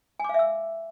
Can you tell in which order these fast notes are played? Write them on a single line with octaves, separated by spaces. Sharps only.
G#5 D6 F5 E5 E6